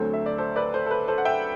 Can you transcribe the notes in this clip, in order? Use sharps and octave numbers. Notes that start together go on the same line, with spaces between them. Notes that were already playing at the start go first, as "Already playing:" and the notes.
Already playing: D2 D3 F#3 C4 A4 C5
E5
D5
A4 C5
B4 D5
A4 C5
A4
B4
A4 C5
F#5
E5 G5